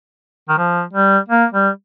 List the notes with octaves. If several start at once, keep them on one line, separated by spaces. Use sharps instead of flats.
D#3
F3
G3
A#3
G3